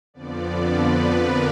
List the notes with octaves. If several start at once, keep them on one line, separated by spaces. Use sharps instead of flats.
F2 D3 F3 B3 D5
B4
A#4